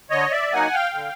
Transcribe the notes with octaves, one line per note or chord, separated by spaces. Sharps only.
D3 C#5 D#5
D5 E5
F#3 A#3 D#4 F#5 G#5
F5 G5
D3